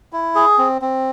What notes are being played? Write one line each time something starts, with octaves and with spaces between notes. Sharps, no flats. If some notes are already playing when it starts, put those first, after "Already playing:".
E4
G#4
C4
C4